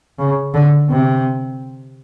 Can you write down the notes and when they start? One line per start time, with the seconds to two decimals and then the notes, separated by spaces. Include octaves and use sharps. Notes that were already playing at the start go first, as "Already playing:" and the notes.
0.19 C#3
0.54 D3
0.90 C3